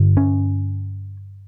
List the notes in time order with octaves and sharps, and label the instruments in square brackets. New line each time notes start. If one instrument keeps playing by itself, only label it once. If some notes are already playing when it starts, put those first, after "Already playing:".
Already playing: [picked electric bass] G2 D3
C#4